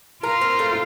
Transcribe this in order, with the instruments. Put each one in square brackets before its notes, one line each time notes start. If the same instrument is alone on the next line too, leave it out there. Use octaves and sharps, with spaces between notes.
[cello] F4 [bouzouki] A#4
[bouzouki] C4
A3